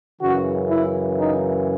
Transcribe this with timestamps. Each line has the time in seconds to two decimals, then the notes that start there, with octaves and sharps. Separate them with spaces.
0.20 F#2 C#3 E3 F#4
0.69 E4
1.17 D#4